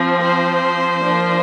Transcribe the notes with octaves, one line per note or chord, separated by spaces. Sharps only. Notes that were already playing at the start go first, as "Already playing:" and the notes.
Already playing: F3 C4
C5
F3 A#3 D4